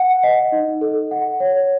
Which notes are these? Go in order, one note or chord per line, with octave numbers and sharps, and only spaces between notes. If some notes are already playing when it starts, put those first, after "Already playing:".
Already playing: F#5
D#5
D#4
A4
F#5
C#5